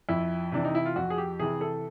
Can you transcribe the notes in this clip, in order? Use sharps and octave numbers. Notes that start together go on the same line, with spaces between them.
F2 E4
C3 E3 D4
D#4
E4
F4
F2 F#4
G#4
G4
C3 E3 G#4
A4